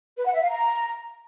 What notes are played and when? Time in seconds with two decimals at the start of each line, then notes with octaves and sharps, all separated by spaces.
0.17 B4
0.26 F#5
0.34 E5
0.42 F5
0.51 A#5